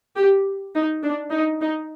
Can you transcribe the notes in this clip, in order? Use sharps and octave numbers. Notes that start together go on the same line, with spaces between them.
G4
D#4
D4
D#4
D#4